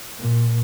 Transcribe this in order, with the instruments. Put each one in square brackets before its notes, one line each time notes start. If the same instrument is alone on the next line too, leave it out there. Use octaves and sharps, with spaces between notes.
[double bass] A#2